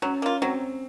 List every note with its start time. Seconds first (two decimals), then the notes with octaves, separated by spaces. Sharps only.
0.02 F#3 C#4
0.22 A#3 F4
0.42 F#3 C4